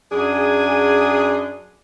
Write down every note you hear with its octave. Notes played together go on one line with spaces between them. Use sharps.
F#2 D4 G#4